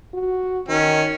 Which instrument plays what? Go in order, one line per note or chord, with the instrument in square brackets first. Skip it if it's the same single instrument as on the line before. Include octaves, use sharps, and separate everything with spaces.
[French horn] F#4
[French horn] D#3 [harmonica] C#4